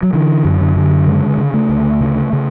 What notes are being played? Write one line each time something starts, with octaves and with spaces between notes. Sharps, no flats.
F#3
D3 E3
F#2
D3
D3
C#3 G#3
C#3
A3
D2
C#3
C#3